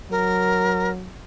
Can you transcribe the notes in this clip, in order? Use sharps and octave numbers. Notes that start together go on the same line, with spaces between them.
F#3 A#4